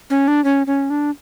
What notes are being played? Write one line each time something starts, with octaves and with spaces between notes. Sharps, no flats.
C#4
D4
C#4
C#4
D4